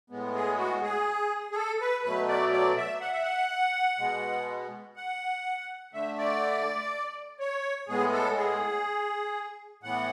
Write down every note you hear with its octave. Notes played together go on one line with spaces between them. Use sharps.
A2 G#3 B3
G#4
F#4
G#4
G#4
A4
B4
B2 F#3 A3 B4
D5
D5
E5
F#5
E5
F#5
B2 G#3 B3
F#5
D3 A3 E5
D5
C#5
A2 G#3 B3 G#4
A4
G#4
A2 E3 B3 F#5